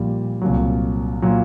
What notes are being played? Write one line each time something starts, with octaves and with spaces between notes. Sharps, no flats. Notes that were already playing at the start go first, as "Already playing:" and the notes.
Already playing: A#1 A#2 G3
C2 A#2 F#3
A#2 F#3